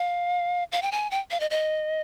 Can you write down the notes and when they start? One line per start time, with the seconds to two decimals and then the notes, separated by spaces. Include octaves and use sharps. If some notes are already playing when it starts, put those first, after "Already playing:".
Already playing: F5
0.72 F5
0.82 G5
0.92 G#5
1.11 G5
1.31 F5
1.40 D#5
1.50 D#5